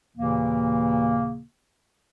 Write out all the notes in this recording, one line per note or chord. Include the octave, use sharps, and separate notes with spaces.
D#2 A#2 C#3 E3 A#3